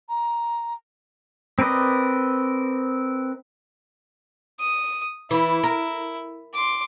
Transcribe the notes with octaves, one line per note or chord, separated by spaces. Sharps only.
A#5
C4 A#4 B4 D5 D#5
D#6
E3 E4
A#4
C6 D6